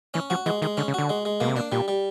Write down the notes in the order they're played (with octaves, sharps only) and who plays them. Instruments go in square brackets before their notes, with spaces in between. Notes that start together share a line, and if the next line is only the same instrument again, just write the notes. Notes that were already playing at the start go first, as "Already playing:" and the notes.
[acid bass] E3 [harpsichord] C#4
[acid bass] F3 [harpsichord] F#4
[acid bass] E3 [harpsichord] G#3
[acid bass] D#3 [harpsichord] G#3
[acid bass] D3 [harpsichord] C#4
[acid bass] C#3
[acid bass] D3 [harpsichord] F#4
[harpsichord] G#3
G#3
[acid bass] B2 [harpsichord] A#3
[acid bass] C3
[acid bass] B2 [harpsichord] D4
[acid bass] A#2 [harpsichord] G3
[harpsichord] G3